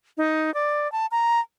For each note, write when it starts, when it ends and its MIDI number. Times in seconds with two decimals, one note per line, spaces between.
0.17 0.53 63
0.54 0.90 74
0.92 1.06 81
1.11 1.40 82